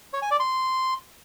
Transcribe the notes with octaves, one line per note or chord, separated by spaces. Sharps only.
C#5
G#5
D5
C6